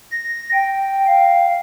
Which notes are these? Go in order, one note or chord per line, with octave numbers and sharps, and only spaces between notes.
A#6
G5
F5